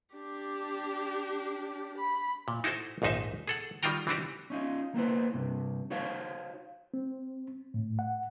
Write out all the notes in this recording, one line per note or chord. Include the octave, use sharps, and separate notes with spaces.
D4 G4
B5
A#2
D#4 E4 F#4 A4 C5
A#1 D#2 G#2 D#4 C5 E5
G#4 A4 F#5
D#3 G3 F4 F#4 G5 A#5
E3 C4 D4 F#4 G4
C#4 D#4 F4
A#3 B3 E4 C5
G2 C3
D#4 F#4 C5 C#5 F5
C4
A2
F#5